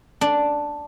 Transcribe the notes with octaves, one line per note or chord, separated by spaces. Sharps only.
D4